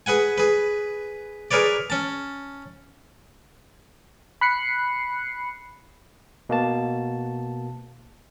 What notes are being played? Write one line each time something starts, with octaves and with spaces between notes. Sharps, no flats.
G#4 B4 F#5 G#5
G#4 B4
G#4 A#4 B4 C#5 D5
C#4 A5
B5 F#6 C7 C#7
B2 A#3 A5